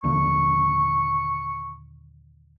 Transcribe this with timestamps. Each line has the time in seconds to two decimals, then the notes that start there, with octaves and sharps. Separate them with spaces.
0.04 A#1 D#2 D3 C#6